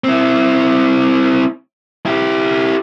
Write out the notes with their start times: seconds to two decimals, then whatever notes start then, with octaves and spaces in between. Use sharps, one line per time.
0.04 C4 E4
2.06 E4 G4